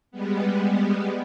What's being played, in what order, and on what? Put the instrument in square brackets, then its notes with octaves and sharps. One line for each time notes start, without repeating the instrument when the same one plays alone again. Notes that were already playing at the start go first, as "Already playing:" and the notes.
[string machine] G3 G#3 B3